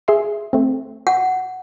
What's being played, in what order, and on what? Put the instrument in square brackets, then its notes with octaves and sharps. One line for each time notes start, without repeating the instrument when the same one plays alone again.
[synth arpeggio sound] G#4 E5 C6
A3 C4
[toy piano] F#5